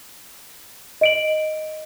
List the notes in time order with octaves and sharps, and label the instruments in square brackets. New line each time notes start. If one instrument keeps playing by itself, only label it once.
[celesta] D#5 D7 F#7